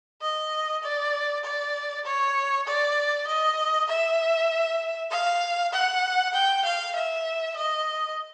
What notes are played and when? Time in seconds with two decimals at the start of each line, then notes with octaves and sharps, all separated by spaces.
0.22 D#5
0.83 D5
1.44 D5
2.05 C#5
2.67 D5
3.28 D#5
3.89 E5
5.11 F5
5.73 F#5
6.34 G5
6.65 F5
6.95 E5
7.56 D#5